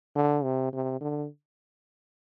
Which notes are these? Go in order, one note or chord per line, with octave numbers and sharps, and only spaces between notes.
D3
C3
C3
D3